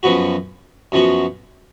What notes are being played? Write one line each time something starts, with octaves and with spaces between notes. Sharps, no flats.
F#2 F3 B3 F#4
F#2 F3 B3 F#4